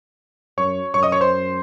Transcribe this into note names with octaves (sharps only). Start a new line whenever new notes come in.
F#2 C#5 C#6
F#2 C#5 C#6
D#5 D#6
C#5 C#6
C5 C6